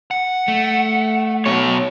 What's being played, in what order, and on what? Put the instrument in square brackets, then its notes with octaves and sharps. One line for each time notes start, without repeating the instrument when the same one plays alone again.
[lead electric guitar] F#5
[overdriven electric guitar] A3
[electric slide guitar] B2 C#5